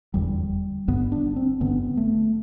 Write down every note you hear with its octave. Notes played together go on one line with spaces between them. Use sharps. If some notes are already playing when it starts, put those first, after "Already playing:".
F1 E2 D3 G3
G1 G2 D3 B3
D4
C4
G1 G2 D3 B3
A3